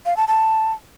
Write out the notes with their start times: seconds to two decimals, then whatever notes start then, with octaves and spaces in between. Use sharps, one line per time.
0.06 F5
0.17 A5
0.28 A5